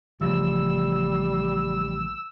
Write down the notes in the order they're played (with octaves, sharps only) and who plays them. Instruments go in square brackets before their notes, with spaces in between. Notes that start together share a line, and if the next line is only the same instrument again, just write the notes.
[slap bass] A1 C#3 F3 [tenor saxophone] G3 [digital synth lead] E6